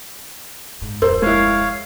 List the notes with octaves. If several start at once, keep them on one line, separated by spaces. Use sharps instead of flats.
G#2
D1 F2 A#4 C5
G#3 E4 C#5 F5